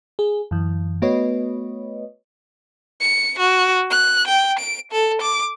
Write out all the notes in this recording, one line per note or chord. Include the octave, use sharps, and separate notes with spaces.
G#4
F#2 E3
A3 B3 F#4 B4 C#5 D#5
C#7
F#4
F#6
G5
D7
A4
D6